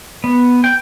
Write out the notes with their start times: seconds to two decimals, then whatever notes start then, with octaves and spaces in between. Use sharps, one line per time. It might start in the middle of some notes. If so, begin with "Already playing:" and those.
0.24 B3
0.64 G5